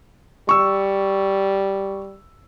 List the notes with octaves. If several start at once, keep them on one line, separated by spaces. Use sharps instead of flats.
G3 C#6 E6